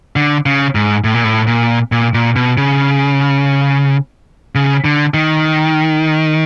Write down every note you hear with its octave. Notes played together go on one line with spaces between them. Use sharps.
D3
C#3
G#2
A2
A#2
A2
A#2
A#2
A#2
B2
C#3
C#3
D3
D#3